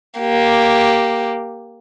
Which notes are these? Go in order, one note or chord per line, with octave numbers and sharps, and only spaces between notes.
A#3 G4